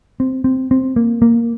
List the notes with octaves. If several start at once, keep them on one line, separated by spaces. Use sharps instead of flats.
C4
C4
C4
A#3
A#3